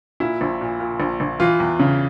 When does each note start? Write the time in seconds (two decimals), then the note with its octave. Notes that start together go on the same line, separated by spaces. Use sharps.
0.20 A#2 E4
0.41 A#1
0.61 A#2
0.80 A#2
1.00 A#1
1.20 A#1
1.40 E3 F4
1.60 E2
1.79 C#3